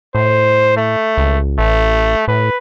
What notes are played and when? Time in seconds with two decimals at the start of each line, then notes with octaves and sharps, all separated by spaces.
0.15 A2 C5
0.77 A3
1.17 C#2
1.58 A1 A3
2.28 A2 B4